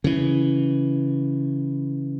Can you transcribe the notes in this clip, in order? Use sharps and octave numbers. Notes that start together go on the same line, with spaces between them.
C#3 E3